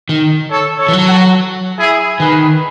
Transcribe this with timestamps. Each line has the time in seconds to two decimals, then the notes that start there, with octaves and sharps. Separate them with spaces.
0.09 D#3
0.51 A4 C#5
0.79 A4 C#5
0.88 E3
0.93 F#3
1.07 F#4 A4
1.78 E4 G#4
2.20 D#3 G#4 B4